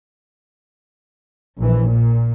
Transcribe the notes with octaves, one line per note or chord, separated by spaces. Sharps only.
A#1 E3
A#2